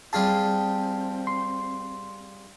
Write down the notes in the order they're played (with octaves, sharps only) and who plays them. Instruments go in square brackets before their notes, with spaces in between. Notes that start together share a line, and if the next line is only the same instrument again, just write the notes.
[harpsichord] G3 F4 G#4 [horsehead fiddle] C4 [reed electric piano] A5
[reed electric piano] C6